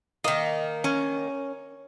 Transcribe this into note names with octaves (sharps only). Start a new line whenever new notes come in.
D#3 A#3 D#5
C#4